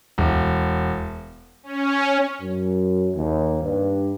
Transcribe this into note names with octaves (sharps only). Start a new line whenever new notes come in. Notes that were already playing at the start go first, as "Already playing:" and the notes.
E1
C#4
F#2
D#2
G2